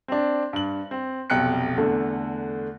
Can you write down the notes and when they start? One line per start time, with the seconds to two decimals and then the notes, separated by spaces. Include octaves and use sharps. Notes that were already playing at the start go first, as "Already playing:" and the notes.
0.08 C4 D4
0.53 G2 F#7
0.91 C4
1.30 F1 B1 G5 F#6 C#7
1.77 E2 D3 A3